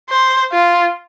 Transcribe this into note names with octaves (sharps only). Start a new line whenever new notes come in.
C5
F4